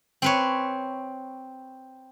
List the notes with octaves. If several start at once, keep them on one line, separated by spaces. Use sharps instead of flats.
C4 B4 C#5